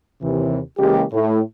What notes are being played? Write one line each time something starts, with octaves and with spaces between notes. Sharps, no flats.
D#2 C3 E3
C#3 E3 G#3 A#3 G4
A2